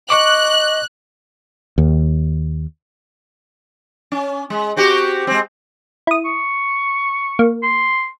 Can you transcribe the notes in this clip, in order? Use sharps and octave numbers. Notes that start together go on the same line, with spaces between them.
D#5 C#6 D6 F#6
D#2
C#4
G#3
C4 F#4 G4
G#3 C4
E4 D#6
C#6
A#3
C6